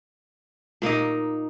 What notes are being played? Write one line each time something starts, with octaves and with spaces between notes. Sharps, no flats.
A#2 A#3 D#4 D#5